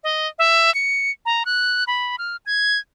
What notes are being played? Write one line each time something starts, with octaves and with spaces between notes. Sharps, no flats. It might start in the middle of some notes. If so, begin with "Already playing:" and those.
D#5
E5
C#7
A#5
F#6
B5
F6
G#6